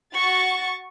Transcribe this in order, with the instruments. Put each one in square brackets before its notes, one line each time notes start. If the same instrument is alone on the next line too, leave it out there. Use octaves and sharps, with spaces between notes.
[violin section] F#4 C#6 A6